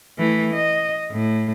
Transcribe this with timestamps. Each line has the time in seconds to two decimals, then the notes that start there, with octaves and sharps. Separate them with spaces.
0.18 E3 A3
0.54 D#5
1.11 A2